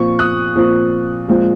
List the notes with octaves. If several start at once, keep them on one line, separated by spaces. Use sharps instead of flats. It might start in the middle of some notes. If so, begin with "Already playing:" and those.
Already playing: A#2 F3 C4 C#6
D#6 F#6
A#2 F3 C4
A#2 F3 G#3 C4